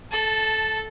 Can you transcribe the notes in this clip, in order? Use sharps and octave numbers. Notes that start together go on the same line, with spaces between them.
A4 A5